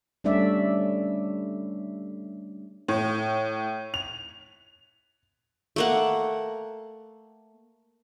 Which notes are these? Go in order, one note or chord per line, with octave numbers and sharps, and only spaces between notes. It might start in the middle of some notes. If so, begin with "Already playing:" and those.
G3 A3 C#4 D4 D5 E5
A2
F7
A3 A#3 F#5